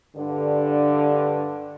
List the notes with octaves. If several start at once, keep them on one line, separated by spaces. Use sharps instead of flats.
G2 D3